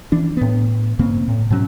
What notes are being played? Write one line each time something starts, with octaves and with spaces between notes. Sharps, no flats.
E3 D4
A2 B3
G2 C#3 A#3 C4
A2
G#2 B2 F#3 C#4